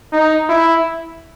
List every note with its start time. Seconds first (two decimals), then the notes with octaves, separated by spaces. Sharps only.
0.13 D#4
0.49 E4